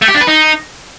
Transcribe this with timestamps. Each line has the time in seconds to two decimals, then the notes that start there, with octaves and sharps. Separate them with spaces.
0.02 A3
0.08 G4
0.14 D4
0.21 B4
0.27 D#4